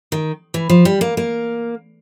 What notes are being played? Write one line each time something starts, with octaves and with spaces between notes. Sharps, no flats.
D#3
E3
F3
G3
A#3
A#3